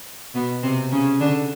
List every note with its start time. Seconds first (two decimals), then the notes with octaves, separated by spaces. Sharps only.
0.34 B2 B3
0.63 C3 C4
0.91 C#3 C#4
1.20 D3 D4